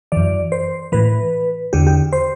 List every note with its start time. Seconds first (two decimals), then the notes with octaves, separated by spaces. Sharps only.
0.12 F#2 E3 D5
0.52 C5
0.92 A2 E3 B4
1.73 E2 D3 G4
1.87 G4
2.13 C5